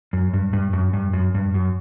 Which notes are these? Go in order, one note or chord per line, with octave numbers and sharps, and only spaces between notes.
F#2
G2
G2
F#2
G2
F#2
G2
F#2